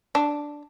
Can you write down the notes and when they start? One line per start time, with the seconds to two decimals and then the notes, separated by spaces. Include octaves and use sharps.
0.15 D4